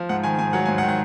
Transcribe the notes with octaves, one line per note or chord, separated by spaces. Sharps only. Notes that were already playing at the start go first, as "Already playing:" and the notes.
Already playing: F3
G#2 F#5
D#3 G#5
G#2 G#5
F#3 F#5
G#2 G#5
F#5
D#3
F#5